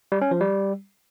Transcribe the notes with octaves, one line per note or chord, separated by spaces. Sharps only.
G3
C#4
F3
G3